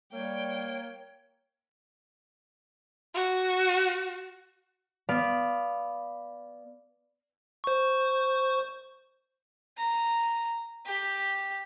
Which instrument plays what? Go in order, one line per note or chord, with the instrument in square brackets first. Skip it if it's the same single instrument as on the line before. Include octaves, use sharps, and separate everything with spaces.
[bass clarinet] G3 [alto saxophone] A#3 [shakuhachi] C#5 [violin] G5
[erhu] F#4
[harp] B3 D5 F5
[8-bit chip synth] C5 C#6
[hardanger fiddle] A#5
G4